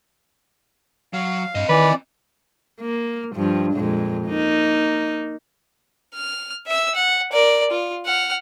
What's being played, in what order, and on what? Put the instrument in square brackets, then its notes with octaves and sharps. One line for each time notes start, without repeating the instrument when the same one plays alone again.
[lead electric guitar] F#3 [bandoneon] F5
[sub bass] G2 [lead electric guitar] C4 D#5
[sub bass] D#3 [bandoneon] E3 D5 [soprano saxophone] B4
[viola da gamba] A#3
G2 F3
F2 A#2 G#3
A#3 D#4
[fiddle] F6
E5 E6
F#5
A#4 D5
F4
F#5 F6